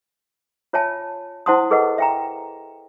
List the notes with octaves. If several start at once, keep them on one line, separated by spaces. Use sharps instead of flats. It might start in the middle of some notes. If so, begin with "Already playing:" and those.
F4 C#5 E5 G#5 A5
E4 C5 F#5 A5 C6 D#6
G#4 A4 B4 D#5 F#5
E5 G5 A#5